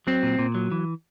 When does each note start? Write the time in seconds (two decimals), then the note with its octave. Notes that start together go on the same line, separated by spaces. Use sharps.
0.07 F#3 C4
0.23 A#2
0.39 A#2
0.55 F#3
0.72 E3